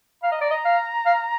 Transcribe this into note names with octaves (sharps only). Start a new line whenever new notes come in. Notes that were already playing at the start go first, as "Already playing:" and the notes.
F5 A#5
D#5
D5
D#5
F5
F5